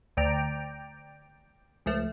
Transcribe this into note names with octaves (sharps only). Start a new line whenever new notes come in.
D2 D5 G5 A#5
C#2 F3 A3